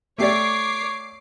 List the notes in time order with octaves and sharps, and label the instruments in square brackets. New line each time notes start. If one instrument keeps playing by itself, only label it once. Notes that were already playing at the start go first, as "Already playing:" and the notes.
[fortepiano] A3 G4 D5 [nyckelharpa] C#5 [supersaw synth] D6 C7